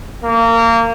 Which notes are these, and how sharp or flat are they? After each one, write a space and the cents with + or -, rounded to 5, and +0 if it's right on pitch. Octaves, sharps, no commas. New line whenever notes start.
A#3 -25